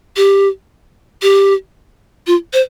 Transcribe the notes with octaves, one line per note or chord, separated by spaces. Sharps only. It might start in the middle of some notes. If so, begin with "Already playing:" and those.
G4
G4
F4
C5